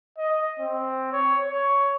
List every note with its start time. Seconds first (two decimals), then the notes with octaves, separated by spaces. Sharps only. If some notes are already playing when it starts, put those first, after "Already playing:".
0.18 D#5
0.60 C4
1.13 C#5
1.49 C#5